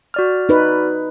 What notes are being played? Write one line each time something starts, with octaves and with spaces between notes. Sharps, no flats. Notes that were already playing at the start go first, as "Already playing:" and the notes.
F#4 D5 F6
D#4 B4